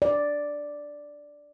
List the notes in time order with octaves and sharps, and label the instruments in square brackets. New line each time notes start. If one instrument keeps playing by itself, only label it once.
[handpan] D5